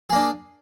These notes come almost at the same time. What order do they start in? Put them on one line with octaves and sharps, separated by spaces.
G#4 A#3 D4